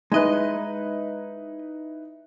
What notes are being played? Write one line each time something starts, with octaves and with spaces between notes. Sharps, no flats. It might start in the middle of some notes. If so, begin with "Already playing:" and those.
G#3 D#4 E4 B4 D#5